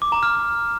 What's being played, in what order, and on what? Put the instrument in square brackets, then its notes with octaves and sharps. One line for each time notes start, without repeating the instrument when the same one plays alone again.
[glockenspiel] D6
A#5
F6